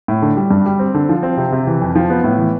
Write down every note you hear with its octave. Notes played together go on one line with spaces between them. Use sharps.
A2
D3
G3
G2
G3
C4
D3
F3
C4
C3
C3
E3
F2
F3
B3
A2
E3